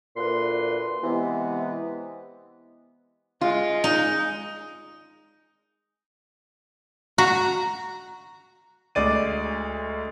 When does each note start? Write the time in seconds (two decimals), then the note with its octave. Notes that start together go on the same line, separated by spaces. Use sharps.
0.17 D2 A#2 B4 C6
1.04 C3 E3 G#3 B3
3.41 G#3 F4
3.84 D#4
7.18 F#4 A#5
8.95 D2 G#3 D5 D#7